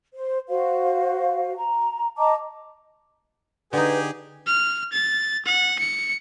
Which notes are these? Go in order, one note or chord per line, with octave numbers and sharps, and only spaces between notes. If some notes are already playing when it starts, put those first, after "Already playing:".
C5
F#4 C5 F5
A#5
D#5 A5 A#5 D6
D3 D#4 G4 G#4 B4
F6
A6
F#5
C#7